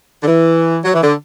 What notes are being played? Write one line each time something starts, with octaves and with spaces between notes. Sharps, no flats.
D3
E3
F#3
E3
D3